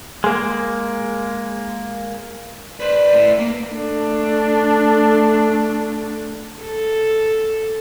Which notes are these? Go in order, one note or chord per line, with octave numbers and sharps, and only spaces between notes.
G#3 A#3
B4 C5 D5
A2
A#3
A3 D4
A4